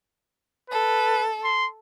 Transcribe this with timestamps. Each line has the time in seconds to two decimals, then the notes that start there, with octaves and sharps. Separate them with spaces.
0.70 A4 B4
1.44 C6